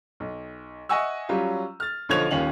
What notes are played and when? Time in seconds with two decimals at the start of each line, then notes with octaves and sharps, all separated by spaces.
0.20 B1
0.89 D#5 E5 F#5 G#5 C#6 E6
1.29 F#3 G3 C#4 F4 G4
1.80 F6 A6
2.09 B1 D3 F3 C#5 G#6 F7
2.31 D#1 D#2 C#4 F4 F#7